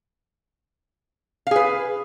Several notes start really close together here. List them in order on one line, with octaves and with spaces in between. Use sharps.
F5 G#4 B4